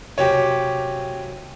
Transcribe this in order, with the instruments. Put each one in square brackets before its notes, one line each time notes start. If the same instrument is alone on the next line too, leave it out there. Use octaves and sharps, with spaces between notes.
[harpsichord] F#2 C3 A#3 [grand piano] G4 C#5